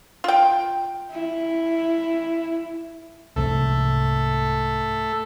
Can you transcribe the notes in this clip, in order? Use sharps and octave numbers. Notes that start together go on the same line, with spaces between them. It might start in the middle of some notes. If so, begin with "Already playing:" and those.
F4 G5
E4
C2 G#2 C3 A3 A4